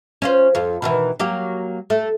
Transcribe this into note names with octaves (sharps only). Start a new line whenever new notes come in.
C#4 F4 C5
F2 F4
B2 D#3 E3
F#3 A#3 G4
A3